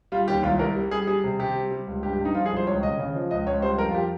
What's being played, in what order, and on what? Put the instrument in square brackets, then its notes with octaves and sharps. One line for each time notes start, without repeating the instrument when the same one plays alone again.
[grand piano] G3 F4
D#2 G4
C2 F4
C2 A#4
G3
G3 G#4
G3 G#4
C3
C3 G4
G3
G3
C#2
G2 G4
G4
G2
D#4
F3 F4
G#4
C2
C5
C#2 C#5
C#3 D#5
C#3
F3
C#2 D#5
C#2 C#5
G3 C5
F2 A#4
F4
G4